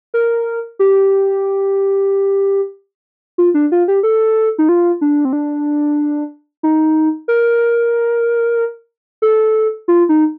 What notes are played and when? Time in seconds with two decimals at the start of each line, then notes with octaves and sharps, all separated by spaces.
0.14 A#4
0.79 G4
3.38 F4
3.54 D4
3.72 F4
3.88 G4
4.03 A4
4.58 D#4
4.69 F4
5.01 D4
5.25 C4
5.33 D4
6.63 D#4
7.28 A#4
9.22 A4
9.88 F4
10.09 D#4